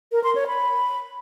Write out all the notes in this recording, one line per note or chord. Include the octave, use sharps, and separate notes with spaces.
A#4
C6
C#5
B5